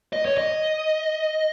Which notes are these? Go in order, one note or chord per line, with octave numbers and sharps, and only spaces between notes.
D#5
C#5
D#5